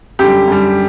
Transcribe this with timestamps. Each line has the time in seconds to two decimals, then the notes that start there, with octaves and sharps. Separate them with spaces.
0.19 F#2 D3 G3 G4
0.47 F#2 D3 G3